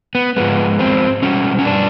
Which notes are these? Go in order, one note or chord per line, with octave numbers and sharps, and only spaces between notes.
B3
G#2 F3 G#3 B3
C4
B2 G3 C#4
C#4
D4